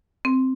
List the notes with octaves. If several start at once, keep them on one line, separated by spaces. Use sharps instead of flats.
C4